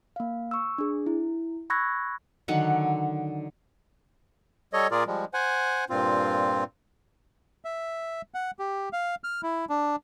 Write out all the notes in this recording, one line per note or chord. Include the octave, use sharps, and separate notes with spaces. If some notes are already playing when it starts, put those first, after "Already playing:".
A#3 F5
C#6 E6
D4 G#4
E4
B5 C#6 E6 F#6 G#6 A#6
D3 D#3 F#3 F#5
G3 A4 C#5 D#5
A#2 F4 G#4 A#4 D5
F3 G3 G#3
C5 F#5 G#5
G2 A#2 C4 F4
E5
F#5
G4
F5
F6
E4
D4